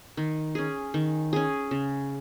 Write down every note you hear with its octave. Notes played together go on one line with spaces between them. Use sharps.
D#3
C#4 G#4
D#3
C#4 G#4
C#3